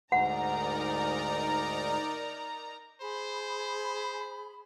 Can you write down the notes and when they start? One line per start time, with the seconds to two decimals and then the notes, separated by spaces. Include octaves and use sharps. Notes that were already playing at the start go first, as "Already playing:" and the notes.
0.12 D2 G#2 D#4 A#4 D5 F#5 A#5
3.01 G#4 C5 B5